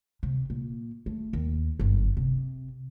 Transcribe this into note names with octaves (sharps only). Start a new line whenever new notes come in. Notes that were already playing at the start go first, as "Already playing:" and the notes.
C3
A#2
A3
D#2
G1 F#2
C3